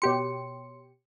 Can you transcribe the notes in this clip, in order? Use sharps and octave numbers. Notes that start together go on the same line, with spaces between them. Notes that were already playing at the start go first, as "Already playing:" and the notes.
B2 G4 C#5 C6 C#7